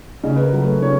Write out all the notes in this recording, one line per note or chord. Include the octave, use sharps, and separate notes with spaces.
C#3 D#5
B4
A#4
F#3 A3
B4
C#3 C#5